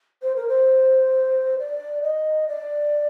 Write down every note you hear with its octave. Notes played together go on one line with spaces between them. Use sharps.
C5
A#4
C5
D5
D#5
D5